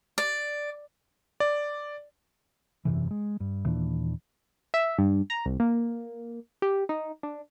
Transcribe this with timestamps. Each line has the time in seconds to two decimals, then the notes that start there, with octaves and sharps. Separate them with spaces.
0.18 D5
1.40 D5
2.85 E1 F#2 C3 E3
3.11 G#3
3.40 G2
3.65 D#2 A#2 E3 D4
4.74 E5
4.98 G2
5.30 A#5
5.46 C2
5.60 A#3
6.62 G4
6.89 D#4
7.23 D4